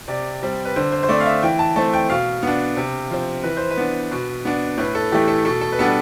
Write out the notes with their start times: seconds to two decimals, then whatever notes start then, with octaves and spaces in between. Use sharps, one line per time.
0.08 C3 D5
0.43 G3 C4
0.65 B4
0.76 D3 C5
0.92 C5
1.03 C5
1.09 A3 C4 D5
1.21 F5
1.26 E5
1.43 E3 G5
1.59 A5
1.76 A3 C4 A5
1.93 G5
2.09 B2 F5
2.43 B3 D4
2.77 C3
3.10 F3 C4
3.44 E3 B4
3.57 C5
3.70 B4
3.77 B3 D4
4.11 B2
4.45 B3 D4
4.77 A2 B4
4.95 A4
5.12 E3 A3 G4
5.28 A4
5.45 B2 A4
5.61 A4
5.72 B4
5.79 G3 B3 D4 A4